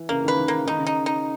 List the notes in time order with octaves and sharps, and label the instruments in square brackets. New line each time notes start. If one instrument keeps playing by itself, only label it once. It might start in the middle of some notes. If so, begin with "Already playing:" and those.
Already playing: [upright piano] E3
[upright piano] C#3 [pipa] A#3
[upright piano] D#3
[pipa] B4
[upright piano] D#3
[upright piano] C#3 [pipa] A#3
[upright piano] D#3 [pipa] D#4
[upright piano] C#3
[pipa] D#4
D#4